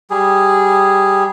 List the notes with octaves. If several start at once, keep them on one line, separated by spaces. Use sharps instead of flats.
G3 G#4